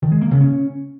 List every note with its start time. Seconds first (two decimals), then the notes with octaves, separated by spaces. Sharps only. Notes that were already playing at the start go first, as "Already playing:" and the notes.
0.02 D#3
0.12 G#3
0.22 A#3
0.31 C#3
0.41 C#4